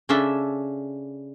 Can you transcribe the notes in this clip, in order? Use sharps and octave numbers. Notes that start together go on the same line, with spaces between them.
C#3 C#4 D4 A4 E5